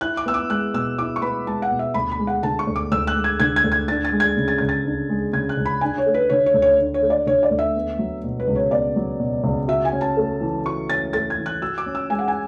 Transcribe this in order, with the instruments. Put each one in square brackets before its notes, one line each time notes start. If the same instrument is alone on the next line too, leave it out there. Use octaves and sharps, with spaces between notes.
[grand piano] E4 [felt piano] F#6
[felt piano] D6
[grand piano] B3 [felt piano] E6
[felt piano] D6
[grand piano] G#3 [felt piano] F#6
[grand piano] B2 [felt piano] E6
[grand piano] E4 [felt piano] D6
[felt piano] C#6
[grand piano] B3 [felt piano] B5
[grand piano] G#3 [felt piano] A5
[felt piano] F#5
[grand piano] B2
[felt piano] E5
[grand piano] D2 [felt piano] B5
[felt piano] B5
[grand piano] G#3
[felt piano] F#5
[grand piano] D3 [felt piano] A5
[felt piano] C#6
[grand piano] D2
[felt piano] D6
[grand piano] D2 [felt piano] E6
[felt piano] F#6
[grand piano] G#3
[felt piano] G#6
[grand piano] D3 [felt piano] G#6
[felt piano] G#6
[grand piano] D2
[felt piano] G#6
[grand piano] D4 [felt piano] A6
[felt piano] A6
[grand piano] G#3
[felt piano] G#6
[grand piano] C#3
[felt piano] A6
[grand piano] C#2 [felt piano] G#6
[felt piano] A6
[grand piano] D4
G#3
[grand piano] C#3 [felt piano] G#6
[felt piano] F#6
[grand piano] C#2
[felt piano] B5
[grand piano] D4 [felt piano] G#5
[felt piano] C#5
[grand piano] A3
[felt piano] B4
[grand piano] D3 [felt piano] C#5
[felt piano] C#5
[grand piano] D2
[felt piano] C#5
[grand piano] D4
[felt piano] C#5
[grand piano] A3
[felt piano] D5
[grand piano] D3 [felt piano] C#5
[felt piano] D5
[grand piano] D2
[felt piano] E5
[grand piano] B3
F#3
B2
[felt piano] B4
[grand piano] C#2
[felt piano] C#5
[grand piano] B3 [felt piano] D5
[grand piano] F#3
B2
C#2
[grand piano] F#4 [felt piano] E5
[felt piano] G#5
[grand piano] C#4
[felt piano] A5
[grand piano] A3
E3
[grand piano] F#4 [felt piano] C#6
[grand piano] C#4 [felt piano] A6
[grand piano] A3 [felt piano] A6
[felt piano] G#6
[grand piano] E3
[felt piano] F#6
[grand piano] F#4 [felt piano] E6
[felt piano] D6
[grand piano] C#4
[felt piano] E6
[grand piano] G#3 [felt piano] G#5
[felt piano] F#5
G#5